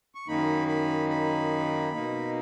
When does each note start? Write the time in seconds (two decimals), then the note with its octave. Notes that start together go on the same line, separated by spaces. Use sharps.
0.15 C#6
0.27 F#2 D#3 A#3 D#4 B5
0.68 B5
1.09 B5
1.93 B2 A#3 D#4